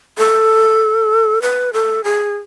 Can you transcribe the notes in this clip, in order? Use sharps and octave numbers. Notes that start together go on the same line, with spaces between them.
A4
B4
A4
G#4